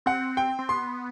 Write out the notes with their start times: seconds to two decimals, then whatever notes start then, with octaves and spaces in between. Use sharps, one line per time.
0.06 C4 F#5
0.37 G5
0.59 C4
0.69 B3 C6